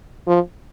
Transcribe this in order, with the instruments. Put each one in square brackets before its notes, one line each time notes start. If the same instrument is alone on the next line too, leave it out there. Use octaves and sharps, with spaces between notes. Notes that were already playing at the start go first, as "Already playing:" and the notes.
[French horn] F3